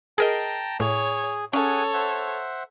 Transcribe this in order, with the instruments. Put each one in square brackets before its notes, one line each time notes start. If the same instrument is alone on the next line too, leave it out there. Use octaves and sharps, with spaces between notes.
[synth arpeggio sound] G#4 A#4 D#5 [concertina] G5 A5 A#5
[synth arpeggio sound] A2 [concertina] G#4 [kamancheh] C#5
[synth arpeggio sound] C#4 [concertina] G#4 F#5 G#5 [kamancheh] A4 C#5
[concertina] C5 E5 F#5